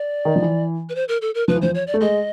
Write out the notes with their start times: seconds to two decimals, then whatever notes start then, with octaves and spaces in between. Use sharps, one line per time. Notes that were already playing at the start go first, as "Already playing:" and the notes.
Already playing: D5
0.25 D#3
0.36 F3
0.42 E3
0.89 B4
0.95 C5
1.08 A#4
1.22 A4
1.35 A#4
1.48 F3 B4
1.56 E3
1.62 F3 C5
1.75 C#5
1.87 D5
1.94 A3
2.01 G#3 D#5